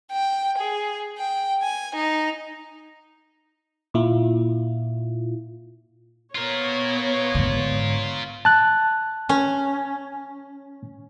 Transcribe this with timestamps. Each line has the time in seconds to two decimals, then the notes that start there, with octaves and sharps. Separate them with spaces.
0.12 G5
0.58 G#4
1.18 G5
1.63 G#5
1.96 D#4
3.94 A#2 E4 F4
6.35 B3 F4 A#4 C#5
7.35 G#2 D3
8.45 A5 F#6
9.29 C#4